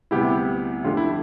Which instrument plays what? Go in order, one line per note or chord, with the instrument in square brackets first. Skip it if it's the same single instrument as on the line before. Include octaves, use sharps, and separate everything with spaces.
[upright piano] D2 C3 G3 B3 [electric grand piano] E4 G4
[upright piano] F2 D3 A3 D4 G4 [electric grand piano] F4
[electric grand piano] E4